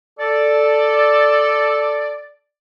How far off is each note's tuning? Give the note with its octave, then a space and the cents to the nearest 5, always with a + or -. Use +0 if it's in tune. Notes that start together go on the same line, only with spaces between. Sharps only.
A4 +0 D5 +0